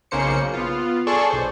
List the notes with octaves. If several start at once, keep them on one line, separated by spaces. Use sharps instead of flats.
B1 C#3 A#3 C5 C#7
B3 F4
G#4 A4 D5 C6 C#6
B1 C5